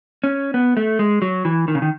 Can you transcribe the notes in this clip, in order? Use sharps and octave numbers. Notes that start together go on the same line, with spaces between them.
C#4
B3
A3
G#3
F#3
E3
D#3
C#3
D#3